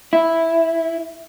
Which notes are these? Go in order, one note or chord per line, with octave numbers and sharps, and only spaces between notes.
E4